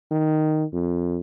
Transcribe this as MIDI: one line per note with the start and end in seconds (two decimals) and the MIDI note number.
0.11 0.65 51
0.73 1.20 41